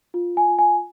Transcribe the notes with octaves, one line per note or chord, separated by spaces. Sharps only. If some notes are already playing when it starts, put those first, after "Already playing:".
F4
G#5
F4
G#5